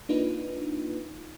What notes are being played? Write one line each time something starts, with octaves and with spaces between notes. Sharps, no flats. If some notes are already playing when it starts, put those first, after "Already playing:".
A#3 D4 D#4 F4 B4